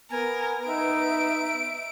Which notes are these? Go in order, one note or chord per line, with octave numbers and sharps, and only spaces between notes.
B3 A#4 G#5
D#4 E5 D7